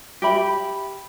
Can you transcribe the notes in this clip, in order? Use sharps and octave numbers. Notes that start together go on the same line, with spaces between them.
G4 E5 B5